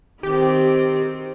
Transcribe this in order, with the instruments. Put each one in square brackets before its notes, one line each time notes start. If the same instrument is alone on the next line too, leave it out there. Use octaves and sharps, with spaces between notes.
[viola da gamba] D#3 C4 [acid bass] G4